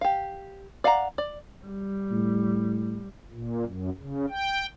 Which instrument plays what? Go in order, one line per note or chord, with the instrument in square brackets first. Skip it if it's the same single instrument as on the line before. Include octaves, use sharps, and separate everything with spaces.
[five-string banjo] G4 F5
D5 F5 F#5 G#5 A#5
D5
[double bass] G3
[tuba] A2
[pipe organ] A#2
F#2
C#3
G5